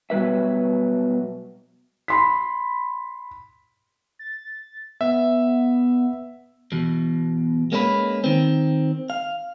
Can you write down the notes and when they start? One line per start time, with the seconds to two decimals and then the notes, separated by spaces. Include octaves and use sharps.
0.10 B2 F#3 G3 B4 E5
2.08 B5 C6 B6
4.19 A6
5.01 B3 E5
6.72 E2 B2
7.72 G#3 A#3 C#4 E4 B4
8.24 D#3 C4
9.10 F5